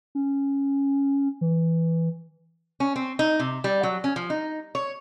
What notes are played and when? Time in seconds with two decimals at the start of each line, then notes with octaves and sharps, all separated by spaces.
0.15 C#4
1.41 E3
2.80 C#4
2.96 C4
3.19 D#4
3.39 C3
3.64 G3
3.83 F#3
4.04 C#4
4.16 F3
4.30 D#4
4.75 C#5